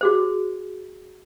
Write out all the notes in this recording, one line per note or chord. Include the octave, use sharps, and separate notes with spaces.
F#4 G#4 C5